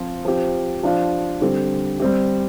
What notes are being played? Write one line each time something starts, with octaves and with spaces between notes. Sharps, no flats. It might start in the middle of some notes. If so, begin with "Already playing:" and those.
Already playing: F3 C4 F4
F3 C4 G4
F3 D4 F4
D3 G3 C4 G4
G3 C4 G4